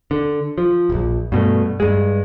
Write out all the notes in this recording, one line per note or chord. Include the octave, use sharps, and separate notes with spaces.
D3
F3
D1 A#1
G2 B2 A3
G2 G#3